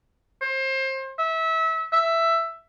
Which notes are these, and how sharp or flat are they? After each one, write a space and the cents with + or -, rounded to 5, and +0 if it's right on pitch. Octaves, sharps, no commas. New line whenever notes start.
C5 +30
E5 -25
E5 +10